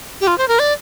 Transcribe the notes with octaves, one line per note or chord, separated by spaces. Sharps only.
G4
F4
C5
A#4
D5